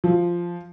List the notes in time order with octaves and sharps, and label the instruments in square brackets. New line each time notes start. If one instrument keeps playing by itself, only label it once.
[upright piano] F3